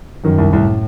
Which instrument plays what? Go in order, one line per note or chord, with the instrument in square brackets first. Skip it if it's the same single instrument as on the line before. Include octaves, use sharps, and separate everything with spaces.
[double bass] F#2 [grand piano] D#3
[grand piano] C2
[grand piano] C2 [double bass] A2